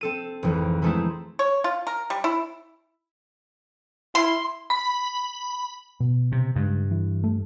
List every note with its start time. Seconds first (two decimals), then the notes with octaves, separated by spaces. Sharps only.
0.01 C4 A4 D#7
0.43 G#1 F2 E3
0.82 E3 G#3 A3 C4 D#4 E4
1.39 C#5
1.64 F4
1.87 A#4
2.10 G3
2.24 E4
4.15 E4 C6
4.70 B5
6.00 B2
6.32 C3
6.56 G2 C#3 G#3
6.91 E3
7.24 A3